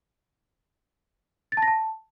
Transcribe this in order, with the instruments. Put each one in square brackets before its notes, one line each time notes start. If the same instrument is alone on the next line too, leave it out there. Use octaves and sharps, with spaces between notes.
[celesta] A6
A5
A#6
A5